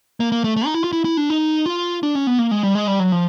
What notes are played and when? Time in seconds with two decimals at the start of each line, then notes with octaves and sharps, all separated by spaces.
0.20 A#3
0.32 A#3
0.44 A3
0.56 A3
0.66 D#4
0.74 E4
0.84 F4
0.93 E4
1.05 E4
1.17 D4
1.30 D#4
1.66 F4
2.03 D4
2.15 C#4
2.27 B3
2.39 A#3
2.51 G#3
2.63 G3
2.75 G#3
2.88 G3
2.99 F#3
3.12 F3